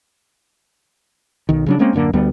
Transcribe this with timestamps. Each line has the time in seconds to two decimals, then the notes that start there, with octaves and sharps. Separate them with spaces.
1.49 B1 D#3
1.66 C#3 F#3 D4
1.79 G#3 A#3 C4 C#4
1.93 D1 F#2 D3 A#3
2.13 D2 G3 B3